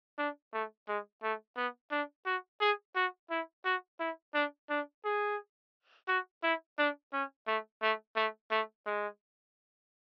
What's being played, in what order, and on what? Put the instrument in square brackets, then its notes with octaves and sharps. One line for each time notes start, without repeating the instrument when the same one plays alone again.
[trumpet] D4
A3
G#3
A3
B3
D4
F#4
G#4
F#4
E4
F#4
E4
D4
D4
G#4
F#4
E4
D4
C#4
A3
A3
A3
A3
G#3